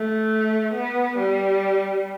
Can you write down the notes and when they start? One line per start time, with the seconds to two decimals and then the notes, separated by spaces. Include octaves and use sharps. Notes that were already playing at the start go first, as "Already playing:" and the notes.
Already playing: A3
0.74 B3
1.18 G3